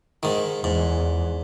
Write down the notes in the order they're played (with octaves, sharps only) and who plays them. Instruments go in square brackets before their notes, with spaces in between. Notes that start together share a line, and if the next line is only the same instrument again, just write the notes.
[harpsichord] G#2 D#3
[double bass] E2 [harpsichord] G#2